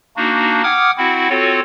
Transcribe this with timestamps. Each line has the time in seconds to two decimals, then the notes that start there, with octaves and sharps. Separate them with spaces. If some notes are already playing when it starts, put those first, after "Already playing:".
0.17 A#3 D4 D#4 F#4
0.64 F#5 G5 D6 D#6 F6 G#6
0.98 C4 E4 F#4 F#5
1.30 C4 F4 F#4 A4 C#5